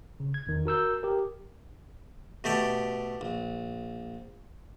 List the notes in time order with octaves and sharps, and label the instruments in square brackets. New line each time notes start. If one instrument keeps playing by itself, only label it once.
[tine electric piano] C#3
G#6
E2 D#3
F#4 A#4 E6 G6
G4 A#4
[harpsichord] B2 A3 G4 D5
A#1